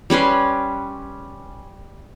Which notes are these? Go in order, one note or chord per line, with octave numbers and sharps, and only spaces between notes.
G3 C#4 B4 C6